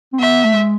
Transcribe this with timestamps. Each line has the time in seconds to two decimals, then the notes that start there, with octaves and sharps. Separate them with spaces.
0.13 C4
0.20 B3 E5
0.45 A3
0.53 G#3